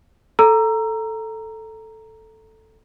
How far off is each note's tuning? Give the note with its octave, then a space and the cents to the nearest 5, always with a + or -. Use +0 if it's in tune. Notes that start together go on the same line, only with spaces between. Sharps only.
A4 +0 A#5 +0 E6 +25